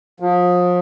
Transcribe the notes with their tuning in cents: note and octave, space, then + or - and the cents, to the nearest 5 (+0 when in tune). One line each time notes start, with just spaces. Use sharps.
F3 +35